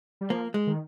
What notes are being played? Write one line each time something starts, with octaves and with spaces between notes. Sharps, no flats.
G3
F3 A#3
G#3
D#3